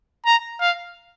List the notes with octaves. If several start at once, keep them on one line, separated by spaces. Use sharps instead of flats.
A#5
F5